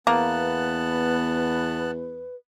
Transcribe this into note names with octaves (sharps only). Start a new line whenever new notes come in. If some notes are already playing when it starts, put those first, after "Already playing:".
E2 A#3 B3 B4 A5 F#6